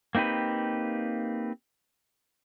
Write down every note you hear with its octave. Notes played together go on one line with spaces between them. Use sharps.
A#3 C4 D#4 G4 B4